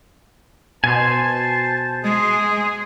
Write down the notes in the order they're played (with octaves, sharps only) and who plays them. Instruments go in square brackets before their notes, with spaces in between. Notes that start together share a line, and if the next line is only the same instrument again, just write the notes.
[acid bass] B2 [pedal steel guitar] C5 G#5 [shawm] A5
[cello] G#3 [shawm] G#4